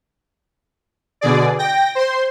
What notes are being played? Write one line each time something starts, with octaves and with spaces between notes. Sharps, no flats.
B2 D3 G#4 D5
G5 A#6
C5 C6